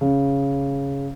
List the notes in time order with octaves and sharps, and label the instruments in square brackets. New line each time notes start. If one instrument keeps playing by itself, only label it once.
[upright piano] C#3